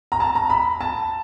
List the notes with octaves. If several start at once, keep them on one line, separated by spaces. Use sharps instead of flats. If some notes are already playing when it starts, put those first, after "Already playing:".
A#5
A5
A#5
B5
A5